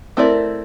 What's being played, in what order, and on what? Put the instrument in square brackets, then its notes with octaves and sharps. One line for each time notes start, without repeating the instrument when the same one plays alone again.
[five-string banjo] A3 C4 E4 A#4 D5